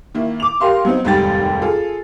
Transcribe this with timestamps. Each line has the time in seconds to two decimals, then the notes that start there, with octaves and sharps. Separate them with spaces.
0.14 D#3 A#3 E4
0.40 D6 F7
0.61 G4 A#4 F5 C6
0.85 F#3 B3 C4 D#4
1.04 F1 D#2 G#2 G3 G5 A6
1.62 F4 G#4 A4